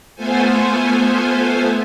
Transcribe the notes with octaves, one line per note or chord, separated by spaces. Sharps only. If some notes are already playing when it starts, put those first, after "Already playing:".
A3 B3 F4 A4 C5 G#5